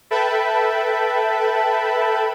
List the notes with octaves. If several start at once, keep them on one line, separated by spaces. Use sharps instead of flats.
A4 B4 E5 G5 A5 B5